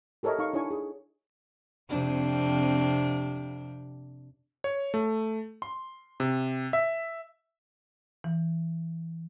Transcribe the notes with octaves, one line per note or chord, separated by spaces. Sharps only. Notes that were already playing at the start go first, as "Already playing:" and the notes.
G4 A4 A#4 C#5 D#5 E5
D#4 F5 C#6
D4 E4 C#5 G#5 C#6
G#4
F2 C3 D4
C#5
A3
C6
C3
E5
E3